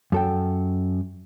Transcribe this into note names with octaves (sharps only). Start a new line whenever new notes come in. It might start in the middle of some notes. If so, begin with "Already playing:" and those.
F#2 A4 G5